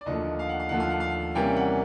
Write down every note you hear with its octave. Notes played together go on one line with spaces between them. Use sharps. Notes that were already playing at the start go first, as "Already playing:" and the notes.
D5
D#2 D3 F3 A3 D#5
F5
F#5
F5
D#2 D3 F3 A3 F#5
F5
F#5
F5
C3 E3 G3 A#3 C#4 G5
F#5